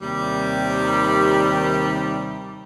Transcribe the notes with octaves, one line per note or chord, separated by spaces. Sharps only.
D#2 C3 D#3 G3